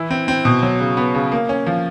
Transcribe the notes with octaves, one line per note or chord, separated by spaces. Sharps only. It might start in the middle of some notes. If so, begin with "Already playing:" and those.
Already playing: E3 E4
C4
C4
B2
F#3
C#3
B3
C#3
A#3
C#4
F3